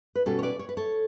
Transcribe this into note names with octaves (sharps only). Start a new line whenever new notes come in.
B4
B2 G3 C#4 F#4 A4
C#5
B4 D5
C#5
B4
A4 C#5